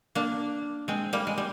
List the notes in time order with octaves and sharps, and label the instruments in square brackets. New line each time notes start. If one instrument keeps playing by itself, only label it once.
[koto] A#3 D4
G#3 C4
G3 A#3
G#3
G3